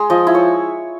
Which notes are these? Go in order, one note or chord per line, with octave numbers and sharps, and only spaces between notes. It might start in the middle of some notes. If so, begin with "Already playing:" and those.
Already playing: G#3
F3 D#5
E4
C#5